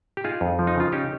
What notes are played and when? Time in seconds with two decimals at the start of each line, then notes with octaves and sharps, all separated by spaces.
0.17 G4
0.24 D#4 F4 G#4
0.41 F2
0.59 F3
0.67 D#4
0.76 C#3 F4
0.92 C#4 D#4 G4